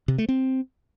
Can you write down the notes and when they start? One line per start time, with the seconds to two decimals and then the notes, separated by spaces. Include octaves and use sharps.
0.08 C3
0.18 A3
0.29 C4